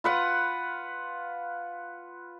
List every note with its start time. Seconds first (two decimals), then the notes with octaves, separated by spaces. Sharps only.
0.04 F4 B4 F#5